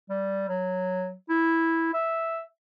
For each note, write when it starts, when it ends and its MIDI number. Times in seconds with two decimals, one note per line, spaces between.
0.10 0.49 55
0.49 1.12 54
1.29 1.92 64
1.94 2.42 76